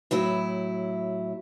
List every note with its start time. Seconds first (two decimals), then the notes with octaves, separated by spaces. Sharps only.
0.11 A2 F#3 E4